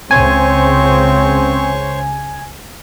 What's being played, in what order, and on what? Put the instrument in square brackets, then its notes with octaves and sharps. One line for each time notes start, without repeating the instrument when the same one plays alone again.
[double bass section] C#2 C#3 [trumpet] C4 [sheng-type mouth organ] C5 C#5 C#6 [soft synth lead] G#5